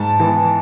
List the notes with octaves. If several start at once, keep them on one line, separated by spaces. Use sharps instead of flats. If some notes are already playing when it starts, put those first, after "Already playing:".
Already playing: G#2 A5
E3 B3